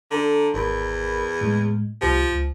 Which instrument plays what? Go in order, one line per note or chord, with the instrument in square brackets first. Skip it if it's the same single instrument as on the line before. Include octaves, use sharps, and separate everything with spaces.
[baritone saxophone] D3 [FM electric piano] A4 A#5
[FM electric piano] G#1 A#4 B5 [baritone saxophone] E2
[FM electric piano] A2 G#3
[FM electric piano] C2 G4 [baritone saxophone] F3
[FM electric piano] C#2